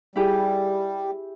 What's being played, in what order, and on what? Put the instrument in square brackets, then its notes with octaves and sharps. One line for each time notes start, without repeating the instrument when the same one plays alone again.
[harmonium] G3 [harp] E4 G4 G#4